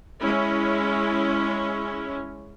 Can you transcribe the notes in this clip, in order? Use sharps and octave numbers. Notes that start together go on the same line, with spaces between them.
G#3 C#4 E4